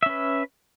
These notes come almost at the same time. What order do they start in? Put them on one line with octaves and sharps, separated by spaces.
E5 C#4 B4